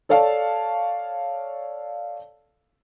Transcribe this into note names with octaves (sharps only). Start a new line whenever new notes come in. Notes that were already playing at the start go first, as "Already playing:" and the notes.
A4 C#5 D5 F5 A5